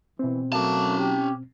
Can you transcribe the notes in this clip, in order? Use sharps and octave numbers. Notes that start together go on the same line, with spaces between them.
B2 E3 C4
F#3 A3 A#3 C#4 F#4 A5 D6
G4